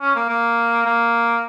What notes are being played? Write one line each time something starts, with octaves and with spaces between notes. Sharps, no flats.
C#4
A#3
A#3
A#3